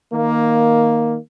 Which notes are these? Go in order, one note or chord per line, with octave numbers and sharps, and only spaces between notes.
D#3 A#3